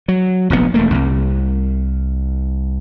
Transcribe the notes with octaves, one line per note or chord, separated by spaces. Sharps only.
F#3
F1 A#1 A2 B3
E1 A3 A#3
C2